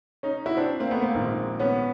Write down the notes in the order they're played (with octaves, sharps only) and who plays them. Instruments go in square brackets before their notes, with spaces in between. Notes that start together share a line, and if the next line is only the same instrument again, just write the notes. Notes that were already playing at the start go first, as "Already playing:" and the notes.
[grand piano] C#4 D#4
E4 F#4
C4 D4
A#3 C4
A3 B3
A#3 C4
A#1 G#2 D#3
B3 C#4